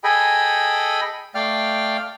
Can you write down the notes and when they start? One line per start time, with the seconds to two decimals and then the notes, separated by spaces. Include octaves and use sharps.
0.04 G#4 A4 D#5 G5 G#5 B5
1.35 A3 D5 F5 G5 F6